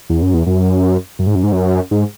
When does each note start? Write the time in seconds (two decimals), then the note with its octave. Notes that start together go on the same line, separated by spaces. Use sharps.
0.10 E2
0.22 F#2
0.34 E2
0.46 F#2
1.19 F#2
1.27 G#2
1.35 F#2
1.43 G#2
1.52 F#2
1.91 G#2